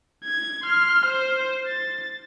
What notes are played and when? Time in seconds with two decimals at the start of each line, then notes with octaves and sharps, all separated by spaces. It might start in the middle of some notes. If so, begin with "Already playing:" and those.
0.25 G#6
0.64 C6 F6
1.06 C5
1.67 A6